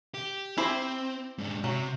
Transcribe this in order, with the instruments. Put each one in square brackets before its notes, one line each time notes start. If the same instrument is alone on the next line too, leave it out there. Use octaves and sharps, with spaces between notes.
[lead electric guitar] G4
[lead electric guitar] C4 [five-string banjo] E4 G4 C5
[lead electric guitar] G#2 D4
[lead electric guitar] C3 [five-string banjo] F#3